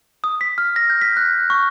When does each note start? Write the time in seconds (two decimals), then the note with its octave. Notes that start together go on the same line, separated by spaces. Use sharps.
0.24 D#6
0.41 B6
0.58 F6
0.76 A#6
0.90 G6
1.01 B6
1.17 F#6
1.50 C#6